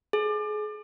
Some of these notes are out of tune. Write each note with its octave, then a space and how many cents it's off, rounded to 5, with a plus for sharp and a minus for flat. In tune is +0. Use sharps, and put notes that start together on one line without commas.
G#4 +30